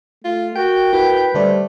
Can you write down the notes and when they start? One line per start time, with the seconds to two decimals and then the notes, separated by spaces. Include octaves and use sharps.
0.24 A3 F4
0.56 F#4 A#4 G5
0.93 E4 F#4 B4
1.34 D3 G3 A3 C5 D5